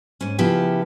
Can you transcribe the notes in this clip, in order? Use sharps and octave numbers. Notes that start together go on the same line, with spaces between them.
G#2 C#4
C#3 F3 B3 E4 G4